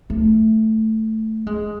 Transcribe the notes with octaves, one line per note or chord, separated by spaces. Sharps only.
A3
G#3